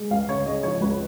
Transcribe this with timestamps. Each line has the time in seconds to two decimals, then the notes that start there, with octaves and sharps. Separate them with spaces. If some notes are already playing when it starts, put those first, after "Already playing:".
Already playing: G#3
0.11 C#2 F5
0.29 C#3 C#5
0.46 G#3 D#5
0.63 F3 C#5
0.81 C#2 B4